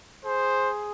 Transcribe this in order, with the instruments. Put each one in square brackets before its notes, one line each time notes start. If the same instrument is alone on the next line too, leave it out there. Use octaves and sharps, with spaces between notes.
[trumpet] G#4 [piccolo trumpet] C5